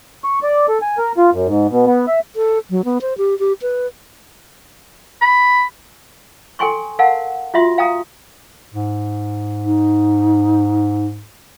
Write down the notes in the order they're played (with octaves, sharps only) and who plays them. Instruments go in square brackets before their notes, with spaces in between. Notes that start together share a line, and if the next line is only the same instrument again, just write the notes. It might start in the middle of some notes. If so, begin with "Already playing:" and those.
[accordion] C#6
D5
A4
G#5
A#4
F4
F#2
G#2
B2
B3
E5
[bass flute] A4
F#3
B3
C5
G4
G4
B4
[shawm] B5
[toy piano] A4 G5 G#5 C6 C#6
A#4 F5 F#5 A5
F4 F#4 E5 C6
F5 G5 A#5 D#6
[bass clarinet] G#2
[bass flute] D#4